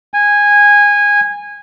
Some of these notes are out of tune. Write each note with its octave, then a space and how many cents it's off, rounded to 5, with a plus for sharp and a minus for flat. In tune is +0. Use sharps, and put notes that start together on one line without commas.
G#5 -15